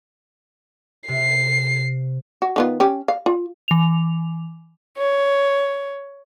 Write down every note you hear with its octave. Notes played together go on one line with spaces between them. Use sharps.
C3 C7
F#4
D#3 B3 F4
C#4 G4
F5
F4
E3 F7
C#5